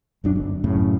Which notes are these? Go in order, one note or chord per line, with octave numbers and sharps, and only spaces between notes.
D#1 F#2 D4
G1
F#2 A2 C#3